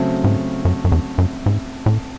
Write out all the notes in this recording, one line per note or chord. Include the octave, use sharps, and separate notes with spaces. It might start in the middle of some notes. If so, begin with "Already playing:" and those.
Already playing: C#3 F#3 A3 C4
G#2
F#2
F#2
E2
F#2
G#2
A2